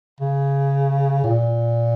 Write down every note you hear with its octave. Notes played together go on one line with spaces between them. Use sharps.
C#3
A#2